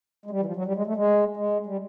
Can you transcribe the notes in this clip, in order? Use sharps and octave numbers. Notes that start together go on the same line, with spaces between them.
G#3
G3
E3
F3
F#3
G3
G#3
A3
G#3
G#3
G3